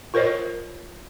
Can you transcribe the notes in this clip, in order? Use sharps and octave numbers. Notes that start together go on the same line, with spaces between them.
F4 A#4 C5 C#5 D#5